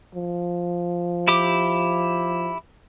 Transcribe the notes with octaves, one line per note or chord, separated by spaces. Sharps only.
F3
E4 G4 D6